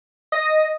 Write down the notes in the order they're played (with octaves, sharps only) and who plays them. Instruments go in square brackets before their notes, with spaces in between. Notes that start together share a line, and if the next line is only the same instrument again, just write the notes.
[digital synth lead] D#5